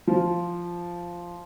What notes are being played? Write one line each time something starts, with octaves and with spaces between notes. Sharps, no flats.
F3